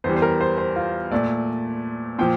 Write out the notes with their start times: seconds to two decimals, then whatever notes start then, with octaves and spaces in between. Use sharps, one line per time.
0.04 E2 E3 G3 C5
0.16 C5
0.22 A#4
0.41 C5
0.58 C5
0.76 F4
1.11 A#2 A3 D5
2.18 A#2 F3 G5